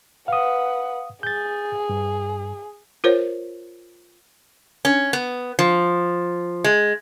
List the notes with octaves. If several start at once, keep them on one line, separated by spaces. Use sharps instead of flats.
B4 F5 F#5 D#6
G#4 G6 A6
G2
F4 A#4 C5 C#5
C#4
B3
F3
G#3